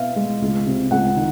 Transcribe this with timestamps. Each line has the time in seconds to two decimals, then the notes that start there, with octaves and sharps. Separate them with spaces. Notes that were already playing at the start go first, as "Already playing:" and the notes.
Already playing: B2 B3 E5 F5
0.16 G#3
0.42 C#2
0.66 C3
0.91 C#2 F#5
1.16 D#3